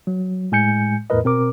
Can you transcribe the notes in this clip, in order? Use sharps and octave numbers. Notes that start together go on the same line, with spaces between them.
F#3
A2 G#3 G#5 G6 C#7
E2 A2 A#4 B4 D#5
B2 C4 A#4 D6